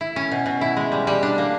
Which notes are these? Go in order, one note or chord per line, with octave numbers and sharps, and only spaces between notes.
E4
C#4
B2
B2
E4
G#3
G3
G3
D4
A#3